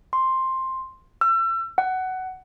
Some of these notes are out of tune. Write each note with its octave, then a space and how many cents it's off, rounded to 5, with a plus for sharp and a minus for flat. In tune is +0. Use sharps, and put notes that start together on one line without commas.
C6 +5
E6 +35
F#5 +15